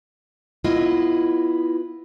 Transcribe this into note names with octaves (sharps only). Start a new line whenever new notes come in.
B3 E4 F4 D#5